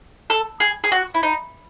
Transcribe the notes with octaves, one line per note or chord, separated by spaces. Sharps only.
A4
G#4
G#4
F#4
E4
D#4